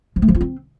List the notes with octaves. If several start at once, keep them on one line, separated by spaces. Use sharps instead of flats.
F3
A3
F3
F4
C4